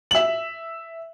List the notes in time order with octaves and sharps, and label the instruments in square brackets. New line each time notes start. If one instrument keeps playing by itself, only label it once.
[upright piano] E5 F#7